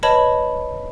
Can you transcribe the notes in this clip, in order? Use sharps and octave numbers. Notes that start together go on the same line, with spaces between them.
B4 C#5 D#5 A5 B5